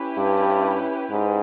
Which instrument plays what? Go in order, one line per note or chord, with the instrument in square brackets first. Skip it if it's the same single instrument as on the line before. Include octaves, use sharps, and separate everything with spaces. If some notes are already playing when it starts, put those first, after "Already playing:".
Already playing: [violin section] C#4 E4 G4 B4
[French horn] G2
G#2